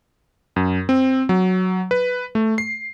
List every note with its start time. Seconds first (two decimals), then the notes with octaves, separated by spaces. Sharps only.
0.56 F#2
0.89 C4
1.29 F#3
1.91 B4
2.35 A3
2.58 C7